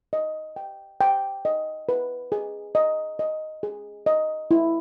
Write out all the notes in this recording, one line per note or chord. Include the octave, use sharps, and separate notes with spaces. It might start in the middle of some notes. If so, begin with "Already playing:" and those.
D#5
G5
G5
D#5
B4
G#4
D#5
D#5
G#4
D#5
E4